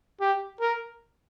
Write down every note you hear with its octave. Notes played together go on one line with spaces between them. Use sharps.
G4
A#4